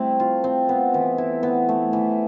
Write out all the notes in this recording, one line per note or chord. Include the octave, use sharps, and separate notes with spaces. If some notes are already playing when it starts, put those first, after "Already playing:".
Already playing: G3 A3 C4 E4
F4
C4
B3
E3
E4
B3
A3
E3